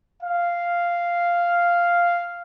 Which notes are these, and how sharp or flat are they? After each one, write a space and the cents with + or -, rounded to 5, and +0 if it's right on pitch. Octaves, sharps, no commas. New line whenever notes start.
F5 -5